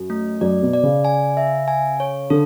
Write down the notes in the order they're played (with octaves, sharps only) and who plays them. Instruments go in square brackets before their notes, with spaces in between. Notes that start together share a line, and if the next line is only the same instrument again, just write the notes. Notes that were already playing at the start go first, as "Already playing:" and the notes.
Already playing: [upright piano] F#2
[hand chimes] A3
[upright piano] F#2 [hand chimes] D5
[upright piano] B2
[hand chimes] D5
[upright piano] C#3
[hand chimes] G#5
E5
G#5
C#5
[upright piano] D3 [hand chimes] A4